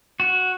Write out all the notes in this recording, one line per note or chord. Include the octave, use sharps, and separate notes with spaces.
F#4